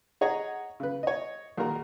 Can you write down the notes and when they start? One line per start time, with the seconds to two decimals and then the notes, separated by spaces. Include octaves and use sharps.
0.21 G#4 C#5 D#5 F#5 A#5
0.80 C#3 B4
1.03 C#5 D#5
1.57 A#1 D#3 F#4 A#4 A#5